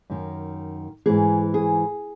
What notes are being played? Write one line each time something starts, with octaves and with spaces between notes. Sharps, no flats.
F#2 D#3
G#2 E3 G#4
G#4